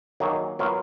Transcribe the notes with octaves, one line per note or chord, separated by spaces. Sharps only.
D#3 F#3 A#3 D#4 G#4
F#3 B3 F4 A#4